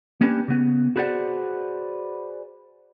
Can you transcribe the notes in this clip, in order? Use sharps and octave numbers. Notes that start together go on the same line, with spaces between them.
A#3 C#4 D4 G4 B4
C#3 B3
F#4 G#4 B4 C5 D5 F#5